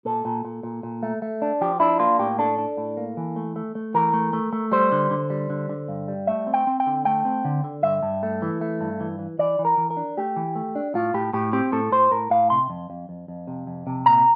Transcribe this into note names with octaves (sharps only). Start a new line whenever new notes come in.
A#2 A4
A#2
A#2
A#2
A#2
A3
A3
D4
F3 G4
D4 E4
A#3 F4
A2 G4
D4 A4
D4
A2
A#3
E3
A3
A3
A3
E3 A#4
A3
A3
A3
G3 C5
D3
D3
G3
D3
D3
G2
G3
A3 E5
C4
G5
C4
G5
D3
A3 G5
C4
D3
D3
G2 E5
G2
A3
E3
A3
G2
E3
E3
E3 D5
E3
A#4
E3
A#4
D4
A3 G4
E3
A3
D4
A2 F4
A2 G4
A2 G4
C4 G4
A2 A4
A2 C5
A2 A#4
A2 F5
C3 C6
F2
F2
F2
F2
C3
F2
C3
A#2 A#5